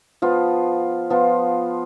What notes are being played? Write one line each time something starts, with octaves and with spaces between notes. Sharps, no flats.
F3 B3 F4
F3 B3 F4